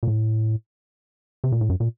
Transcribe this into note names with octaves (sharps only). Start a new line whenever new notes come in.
A#2
A2
C3
A#2
A2
F#2
A#2